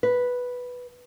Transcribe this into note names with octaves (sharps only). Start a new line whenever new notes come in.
B4